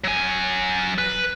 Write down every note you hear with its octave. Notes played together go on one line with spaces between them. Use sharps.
F#3 G#5
B4